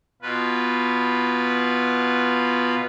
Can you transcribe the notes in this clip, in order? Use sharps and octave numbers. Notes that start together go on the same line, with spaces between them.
B2 F4 B4